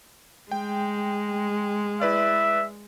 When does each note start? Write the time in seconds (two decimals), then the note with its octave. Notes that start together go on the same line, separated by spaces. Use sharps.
0.52 G#3 G5
2.01 E4 B4 D5 E5